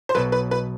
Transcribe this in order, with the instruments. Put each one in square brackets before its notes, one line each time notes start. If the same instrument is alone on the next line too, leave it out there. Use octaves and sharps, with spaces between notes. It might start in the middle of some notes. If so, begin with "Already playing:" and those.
[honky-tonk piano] C5
[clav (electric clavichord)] B1 B2 F#3 [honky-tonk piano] B4
[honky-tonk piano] B4
B4